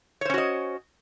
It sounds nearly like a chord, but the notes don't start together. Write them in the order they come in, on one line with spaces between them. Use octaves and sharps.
C#5 C5 C#4 F#4 D#5